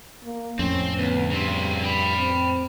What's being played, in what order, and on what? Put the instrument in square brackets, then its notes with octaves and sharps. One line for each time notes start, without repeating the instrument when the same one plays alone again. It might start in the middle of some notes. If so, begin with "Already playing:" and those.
[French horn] A#3
[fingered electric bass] F2 A2 [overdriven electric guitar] C4 [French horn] C#4
[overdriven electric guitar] D2 [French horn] B3
[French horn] G2 [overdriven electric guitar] C#3 C4
[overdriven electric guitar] G5 B5
[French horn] C4